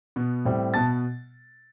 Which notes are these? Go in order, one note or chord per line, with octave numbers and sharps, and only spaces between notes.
B2 B3
A2 G3 C4
B2 B3 A5 A6